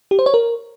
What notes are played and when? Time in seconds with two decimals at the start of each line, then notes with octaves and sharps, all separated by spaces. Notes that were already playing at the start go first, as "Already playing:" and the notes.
0.11 G4
0.19 C5
0.26 C#5
0.34 A#4